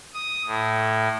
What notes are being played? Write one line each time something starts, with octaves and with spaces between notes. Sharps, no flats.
D#6
A2